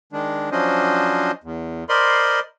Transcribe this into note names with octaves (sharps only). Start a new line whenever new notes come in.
D#3 G#3 D4
F3 F#3 C#4 D4 C5 D#5
E2
A#4 C5 D5 D#5 B5 C6